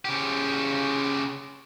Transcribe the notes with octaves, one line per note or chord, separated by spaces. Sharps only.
C#3 G4